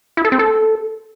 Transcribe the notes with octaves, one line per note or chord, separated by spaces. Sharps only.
E4
A4
C4
A4